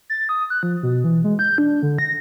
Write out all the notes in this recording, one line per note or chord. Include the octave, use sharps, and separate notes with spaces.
A6
D#6
F#6
F3
B2
E3
G#3
G6
D4
D3
A#6